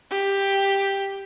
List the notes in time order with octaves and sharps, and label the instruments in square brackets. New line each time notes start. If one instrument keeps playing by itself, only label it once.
[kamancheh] G4